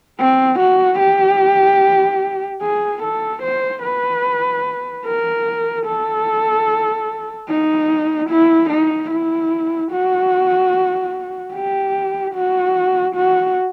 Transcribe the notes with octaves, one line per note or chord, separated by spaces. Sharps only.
C4
F#4
G4
G#4
A4
C5
B4
A#4
A4
D#4
E4
D#4
E4
F#4
G4
F#4
F#4